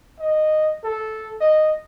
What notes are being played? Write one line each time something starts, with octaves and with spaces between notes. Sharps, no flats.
D#5
A4
D#5